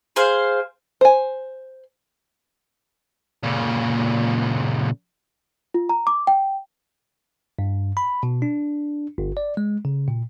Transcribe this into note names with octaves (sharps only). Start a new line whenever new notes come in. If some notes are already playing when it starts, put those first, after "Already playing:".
G#4 C5 F5
C5 G#5
A#2 C#3
F4
A#5
D6
G5
G2
B5
B2
D4
G1
D5
G#3
C#3
A#2